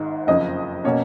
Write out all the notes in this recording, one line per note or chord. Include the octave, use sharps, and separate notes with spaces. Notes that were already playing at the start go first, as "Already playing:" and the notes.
Already playing: G#1 G#2 D#3
F#1 F2 F3 D#5
B2 A#3 C#4 C#5